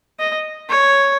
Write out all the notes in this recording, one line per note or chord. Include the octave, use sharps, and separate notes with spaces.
D#5
C#5